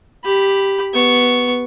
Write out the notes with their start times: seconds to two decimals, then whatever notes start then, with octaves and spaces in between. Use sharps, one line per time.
0.24 G4 B5
0.93 B3 C#6